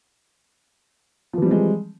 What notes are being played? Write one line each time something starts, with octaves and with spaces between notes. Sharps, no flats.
E3 F3 G3 G#3 C4